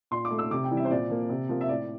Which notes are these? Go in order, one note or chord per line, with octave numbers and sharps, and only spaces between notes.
A#2 C6
D6
A3
E6
C3 D6
G5
E3 G3
E5
C5
A#2 D5
F3 A#3
C3
F3 A#3
E5
A2 D5